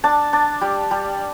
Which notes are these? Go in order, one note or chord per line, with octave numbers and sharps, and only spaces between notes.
D4 A5
D4
G3
G3